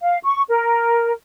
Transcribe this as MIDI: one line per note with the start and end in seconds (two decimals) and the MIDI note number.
0.01 0.18 77
0.24 0.42 85
0.48 1.12 70